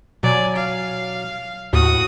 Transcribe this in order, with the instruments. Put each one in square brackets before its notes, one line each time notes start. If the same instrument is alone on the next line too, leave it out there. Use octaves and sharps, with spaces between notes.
[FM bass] B2 [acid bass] F#3 [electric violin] D5 G#5
[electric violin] F5
[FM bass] D#2 [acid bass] A2 [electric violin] F#4 D#6